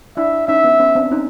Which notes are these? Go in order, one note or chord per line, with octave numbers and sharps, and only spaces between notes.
D4 E4 E5
C#4 D#4 E5
B3 C#4
B3 C#4
C4 D4
C#4 D#4